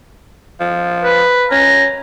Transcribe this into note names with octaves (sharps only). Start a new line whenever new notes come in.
F3
B4
C#4 A#5